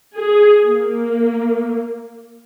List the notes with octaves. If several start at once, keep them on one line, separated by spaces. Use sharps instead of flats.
G#4
A#3